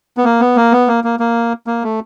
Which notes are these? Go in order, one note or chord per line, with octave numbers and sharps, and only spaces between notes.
B3
A#3
B3
A#3
B3
A#3
A#3
A#3
A#3
A3